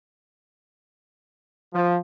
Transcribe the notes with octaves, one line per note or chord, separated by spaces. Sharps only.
F3